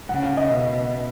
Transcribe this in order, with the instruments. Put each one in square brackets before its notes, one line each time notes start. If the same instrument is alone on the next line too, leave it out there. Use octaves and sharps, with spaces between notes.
[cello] C#3 [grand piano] F#5
[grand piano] F5
D#5
[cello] B2 [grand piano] E5